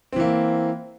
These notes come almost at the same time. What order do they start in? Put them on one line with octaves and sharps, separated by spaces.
C4 E3 A#3